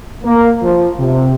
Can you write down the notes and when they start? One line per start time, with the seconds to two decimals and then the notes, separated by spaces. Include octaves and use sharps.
0.24 A#3
0.62 F3
0.99 C3